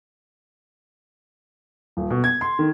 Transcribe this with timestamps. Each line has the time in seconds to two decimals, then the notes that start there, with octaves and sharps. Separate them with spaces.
1.97 D#1
2.11 B2
2.24 G#6
2.41 C6
2.59 D#3